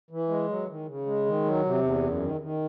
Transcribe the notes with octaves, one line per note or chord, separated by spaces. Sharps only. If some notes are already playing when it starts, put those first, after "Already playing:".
E3
G#3
F#3
D#3
C#3
G#3
D#3
F#3
C3
E2
F#2
D#3
D#3